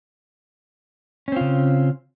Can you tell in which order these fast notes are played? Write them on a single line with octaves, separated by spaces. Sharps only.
C#4 C4 F4 C#3